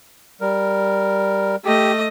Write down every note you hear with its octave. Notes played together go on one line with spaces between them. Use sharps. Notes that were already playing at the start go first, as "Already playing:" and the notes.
G3 A#4
A3 G4 D#5